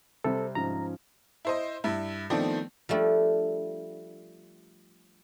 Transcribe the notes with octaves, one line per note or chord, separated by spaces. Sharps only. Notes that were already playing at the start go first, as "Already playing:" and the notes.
C3 G3 C4 A4
G#2 F3 C#4 A#5
E4 C5 D#5
G2 E4
D#3 F3 A3 B3 C4 D4
F3 G3 A3 D4